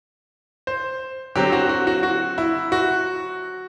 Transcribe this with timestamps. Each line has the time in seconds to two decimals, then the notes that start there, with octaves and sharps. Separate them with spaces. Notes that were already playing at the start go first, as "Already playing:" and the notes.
0.67 C5
1.35 D3 F#3 C4 G4
1.52 F#4
1.69 F#4
1.87 F#4
2.03 F#4
2.38 E4
2.72 F#4